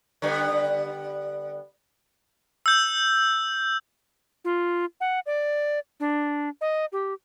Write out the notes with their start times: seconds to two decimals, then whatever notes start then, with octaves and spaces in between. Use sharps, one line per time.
0.22 D3 G3 B3
2.66 E6 G6
4.45 F4
5.01 F#5
5.26 D5
6.00 D4
6.61 D#5
6.92 G4